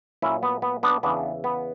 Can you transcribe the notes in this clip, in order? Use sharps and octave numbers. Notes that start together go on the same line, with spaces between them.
A#2 F#3 C#4 E4
B3
B3
B3 D4
E2 C#3 E3 B3 D4
B3